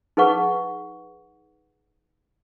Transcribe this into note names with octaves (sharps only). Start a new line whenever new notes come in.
D#4 G#4 B4 F#5 C#6